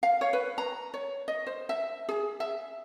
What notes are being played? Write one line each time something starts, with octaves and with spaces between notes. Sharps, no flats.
F5
C#5
B4
A#5
C#5
D#5
C5
E5
G#4
E5